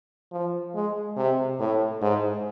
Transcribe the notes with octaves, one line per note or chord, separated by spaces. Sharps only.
F3
G#3
C3
A2
G#2